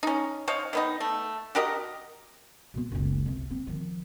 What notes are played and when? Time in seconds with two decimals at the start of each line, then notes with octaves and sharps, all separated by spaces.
0.03 C#4 D#4
0.48 C5 C#5 D#5 F5
0.73 D#3 B3 D#4
1.00 A3
1.55 F#4 G4 A#4 D#5
2.74 B2 B3
2.92 F#1 C#2
3.26 C2 C3
3.51 C4
3.67 D#3 F3